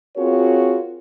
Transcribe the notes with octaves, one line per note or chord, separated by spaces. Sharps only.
C4 F4 F#4 G#4 A#4 C#5